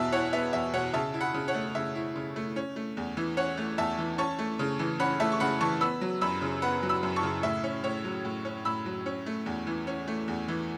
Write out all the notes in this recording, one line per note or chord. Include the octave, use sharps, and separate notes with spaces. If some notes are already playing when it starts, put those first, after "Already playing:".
Already playing: E2 B2 E5 A5
E4 C#5 F#5
B3 E5
E2 E5
B2 C#5 F#5
C#3 E5 A5
E4
F#5 B5
C#3
C#5 F#5
A3
C#3 E5
E4
C#3
A3
C#4
A3
E2
E3
C#4 C#5 F#5
A3
E2 E5 A5
E3
C#4 A5 C#6
A3
C#3
E3
C#4 F#5 B5
A3 E5 A5
C#6
C#3 F#5 B5
E3 A5 C#6
B3 B5 E6
F#3
F#2 B5 E6
C#3
B3 F#5 B5
F#3
B5 E6
F#2
A5 C#6
C#3
A2 E5
C#4
A2 C#5
F#3
A2
C#4
A2 B5 E6
F#3
C#4
A3
E2
E3
C#4
A3
E2
E3